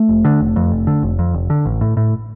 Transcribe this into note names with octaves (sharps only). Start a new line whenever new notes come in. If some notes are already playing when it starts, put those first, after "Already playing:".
Already playing: A3
F1
D3
F1
F2
F1
D3
F1
F2
F1
D3
A1
A2
A2